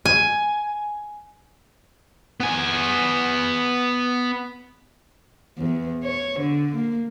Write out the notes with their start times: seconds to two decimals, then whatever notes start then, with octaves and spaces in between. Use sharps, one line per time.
0.05 G#5
2.40 B3 G#5
5.58 E2
6.04 C#5
6.40 D3
6.76 A#3